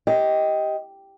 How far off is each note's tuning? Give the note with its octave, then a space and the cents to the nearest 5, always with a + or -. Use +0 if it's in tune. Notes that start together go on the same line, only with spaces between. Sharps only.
G4 +0 D#5 +15